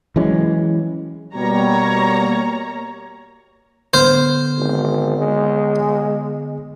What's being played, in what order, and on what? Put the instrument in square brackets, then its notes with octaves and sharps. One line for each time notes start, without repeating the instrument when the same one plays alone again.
[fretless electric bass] E3 F#3 G#3 C#4
[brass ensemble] B2 G3 [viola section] A#3 C#5 A#5
[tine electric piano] D3 B3 F6 [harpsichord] C5
[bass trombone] G#1
G#3